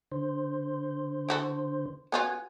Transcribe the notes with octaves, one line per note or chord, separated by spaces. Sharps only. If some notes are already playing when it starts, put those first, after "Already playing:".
D3 C5
E4 F#4 A4
B3 C#4 F4 F#4 F#5 G#5